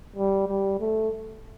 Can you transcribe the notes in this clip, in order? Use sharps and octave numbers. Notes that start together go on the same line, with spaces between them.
G3
G3
A3